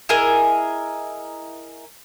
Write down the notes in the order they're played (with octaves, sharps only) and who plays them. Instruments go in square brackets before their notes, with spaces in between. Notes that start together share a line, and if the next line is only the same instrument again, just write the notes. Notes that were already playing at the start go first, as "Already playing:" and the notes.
[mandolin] E4 G#4 A#4 D#5